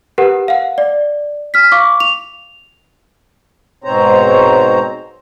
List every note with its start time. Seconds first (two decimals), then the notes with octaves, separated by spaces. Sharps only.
0.18 G4 A#4 B4 F#5
0.48 F5 F#5
0.78 D5
1.54 F6 B6
1.72 F5 C#6 D6
2.00 F7
3.84 G#2 B2 C4 C5 C#5 A#5